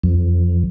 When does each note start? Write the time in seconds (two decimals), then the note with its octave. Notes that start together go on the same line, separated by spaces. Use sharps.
0.03 F2